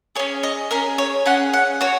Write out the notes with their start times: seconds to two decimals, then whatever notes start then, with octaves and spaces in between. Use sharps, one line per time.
0.15 G#4 C#5
0.19 C#4
0.43 D#5
0.71 C#4 G#4 A#4
0.98 C#5
1.26 C#4 G#4 F#5
1.53 F#5
1.81 F#4 C#5